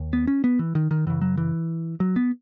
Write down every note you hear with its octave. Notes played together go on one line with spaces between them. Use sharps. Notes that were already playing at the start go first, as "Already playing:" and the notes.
Already playing: D#2
B3
C#4
B3
E3
D#3
D#3
F#2 C#3 E3
F#3
E3
F#3
B3